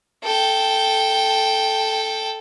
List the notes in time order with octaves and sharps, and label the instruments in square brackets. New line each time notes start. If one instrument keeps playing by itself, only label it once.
[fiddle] A4 G5